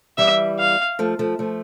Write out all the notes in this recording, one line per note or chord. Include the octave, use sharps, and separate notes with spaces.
E3 G3 E5
F5
F3 A3
F3 A3
F3 A3